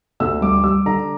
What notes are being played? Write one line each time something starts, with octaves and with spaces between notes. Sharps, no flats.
D2 E6
G3 D6
G3 E6
D3 A#5